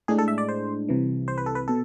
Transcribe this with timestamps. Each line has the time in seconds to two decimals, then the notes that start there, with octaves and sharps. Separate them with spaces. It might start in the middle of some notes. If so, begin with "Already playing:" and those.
0.08 A2 G#3 D4 G#4
0.19 A4
0.28 E5
0.38 D5
0.49 C5
0.89 C2 C3 E3
1.28 C5
1.38 B4
1.46 A4
1.55 B4
1.68 B2 A4